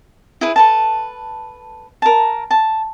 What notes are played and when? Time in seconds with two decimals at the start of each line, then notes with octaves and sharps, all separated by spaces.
0.41 E4 G#4 B4
0.56 A4 B4 A5
2.02 A#4 A5
2.51 A5